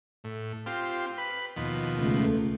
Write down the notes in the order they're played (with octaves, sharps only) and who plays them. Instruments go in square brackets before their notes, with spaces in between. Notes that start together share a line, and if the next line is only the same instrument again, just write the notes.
[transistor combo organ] A2
C4 F4 G4
B4 B5
D#2 B2 F3
[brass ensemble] C#2 A3